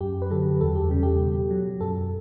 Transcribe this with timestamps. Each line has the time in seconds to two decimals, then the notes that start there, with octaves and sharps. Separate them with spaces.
0.01 F#2 G4
0.22 B4
0.30 D3 F#3 A4
0.60 E2 A4
0.75 G4
0.90 C#3 G3
1.03 G4
1.21 B2
1.51 F#3
1.81 F#2 A4